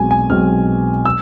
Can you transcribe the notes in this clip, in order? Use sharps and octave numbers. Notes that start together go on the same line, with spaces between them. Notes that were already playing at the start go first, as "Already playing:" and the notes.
Already playing: B1 B2 G#3 C4 G#5
G#5
B1 B2 G#3 C4 F6
E6